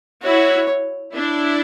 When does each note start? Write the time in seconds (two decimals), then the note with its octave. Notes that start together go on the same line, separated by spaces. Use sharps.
0.24 E4 F#4 C#5
1.15 D4 E4